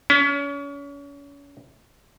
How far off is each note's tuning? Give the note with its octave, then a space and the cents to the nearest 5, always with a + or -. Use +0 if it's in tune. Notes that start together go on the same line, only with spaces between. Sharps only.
C#4 +35